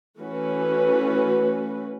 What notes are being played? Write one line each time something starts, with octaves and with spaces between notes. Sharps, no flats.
E3 A3 C#4 F#4 B4